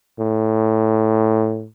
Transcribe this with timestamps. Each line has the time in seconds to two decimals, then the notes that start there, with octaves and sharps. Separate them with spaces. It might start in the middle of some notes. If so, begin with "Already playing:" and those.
0.19 A2